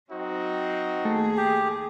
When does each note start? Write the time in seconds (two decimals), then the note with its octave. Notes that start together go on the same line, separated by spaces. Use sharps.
0.10 F#3 C4 D#4 F#4
1.05 D#2 A3 G#4
1.37 G4